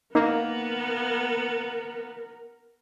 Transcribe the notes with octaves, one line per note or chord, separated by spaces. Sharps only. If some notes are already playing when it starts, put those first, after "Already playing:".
A#3 B3 D#4 A#4